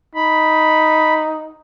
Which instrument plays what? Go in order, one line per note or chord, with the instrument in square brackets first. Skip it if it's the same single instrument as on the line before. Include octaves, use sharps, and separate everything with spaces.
[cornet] D#4 [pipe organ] B5